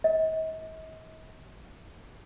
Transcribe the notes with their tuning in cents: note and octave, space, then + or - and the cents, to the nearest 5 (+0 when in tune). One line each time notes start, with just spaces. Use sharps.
D#5 +45